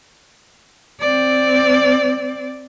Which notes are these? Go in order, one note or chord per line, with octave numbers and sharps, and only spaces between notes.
C4 D5